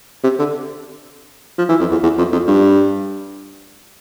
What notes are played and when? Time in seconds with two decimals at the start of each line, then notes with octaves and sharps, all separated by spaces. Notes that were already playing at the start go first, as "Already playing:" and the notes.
0.24 C3
0.39 D3
1.58 F3
1.69 E3
1.80 F2
1.91 E2
2.03 E2
2.18 F2
2.33 F2
2.47 G2